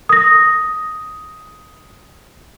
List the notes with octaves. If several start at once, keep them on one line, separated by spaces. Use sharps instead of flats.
D#6 A#6